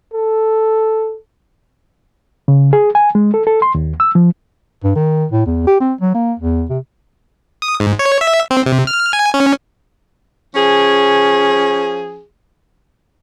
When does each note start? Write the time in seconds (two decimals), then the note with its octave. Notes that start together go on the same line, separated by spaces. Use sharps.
0.14 A4
2.48 C#3
2.73 G#4
2.95 G#5
3.15 G#3
3.34 A4
3.47 A4
3.62 C6
3.75 D#2
4.00 E6
4.15 F3
4.84 G2
4.95 D#3
5.32 A2
5.46 E2
5.67 G4
5.81 C4
6.01 F#3
6.14 A#3
6.39 E2
6.70 C3
7.62 D#6
7.80 G#2
7.99 C#5
8.21 E5
8.51 C4
8.66 C3
8.87 F6
9.13 G#5
9.34 C#4
10.54 F3 C#4 G#4